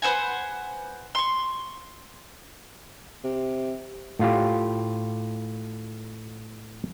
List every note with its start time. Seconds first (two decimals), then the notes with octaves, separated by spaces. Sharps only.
0.02 B4 C5 F#5 G#5
1.15 C6 C#6
3.24 C3
4.19 A2 F4 G4